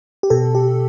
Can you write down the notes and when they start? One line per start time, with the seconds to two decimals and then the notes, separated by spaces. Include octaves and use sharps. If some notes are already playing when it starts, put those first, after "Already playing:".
0.23 G4
0.30 B2 A4
0.55 G4